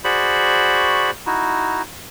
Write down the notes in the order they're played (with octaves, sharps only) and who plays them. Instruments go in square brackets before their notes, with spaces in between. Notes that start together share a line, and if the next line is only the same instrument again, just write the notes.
[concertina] F#4 G#4 C5 D5 B5 C#6
D#4 E4 F#4